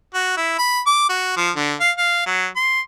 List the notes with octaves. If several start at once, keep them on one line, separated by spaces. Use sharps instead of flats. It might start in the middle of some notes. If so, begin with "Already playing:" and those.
F#4
E4
B5
D6
F#4
F3
D3
F5
F5
F#3
C6